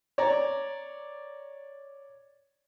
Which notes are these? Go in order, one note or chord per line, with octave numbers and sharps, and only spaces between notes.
C#5 D5 A#5